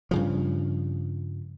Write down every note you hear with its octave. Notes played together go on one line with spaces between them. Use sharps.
G2 C#3 F3